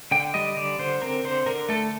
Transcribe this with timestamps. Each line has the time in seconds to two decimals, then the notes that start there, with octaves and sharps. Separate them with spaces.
0.11 D3 G5
0.34 G3 D#5
0.57 D3 D5
0.79 D3 C5
1.02 C4 A#4
1.24 D3 C5
1.46 D3 A#4
1.69 A3 A4